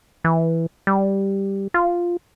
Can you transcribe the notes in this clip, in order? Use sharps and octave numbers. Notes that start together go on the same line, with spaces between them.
E3
G3
F4